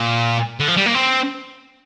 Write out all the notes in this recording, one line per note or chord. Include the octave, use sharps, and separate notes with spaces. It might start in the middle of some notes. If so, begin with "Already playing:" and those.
Already playing: A#2
D3
F3
G3
A#3
C4